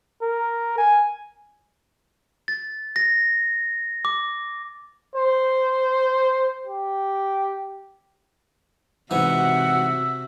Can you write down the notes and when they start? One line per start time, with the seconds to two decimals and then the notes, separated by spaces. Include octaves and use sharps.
0.22 A#4
0.78 G#5
2.48 A6
2.96 A#6
4.05 D6
5.16 C5
6.67 G4
9.11 G#2 C3 E3 F#4 E5 F#5